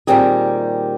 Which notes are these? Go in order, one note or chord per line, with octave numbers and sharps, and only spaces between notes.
A#2 D#3 G3 C4 G4 G#4